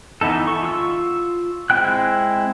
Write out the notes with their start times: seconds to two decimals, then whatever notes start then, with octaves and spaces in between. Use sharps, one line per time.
0.21 E3 B3 D#4 A4
0.47 C#6
0.63 F4 C#6 E6
1.70 G#3 C4 E4 G5 F#6